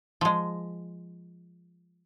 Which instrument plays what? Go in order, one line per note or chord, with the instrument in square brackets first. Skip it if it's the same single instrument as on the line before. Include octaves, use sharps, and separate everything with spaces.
[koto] F3 G#3